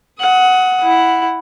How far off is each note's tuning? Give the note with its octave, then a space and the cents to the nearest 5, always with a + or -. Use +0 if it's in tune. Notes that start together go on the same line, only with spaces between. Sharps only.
F#5 +0 D#6 +30
E4 +0 F#5 +0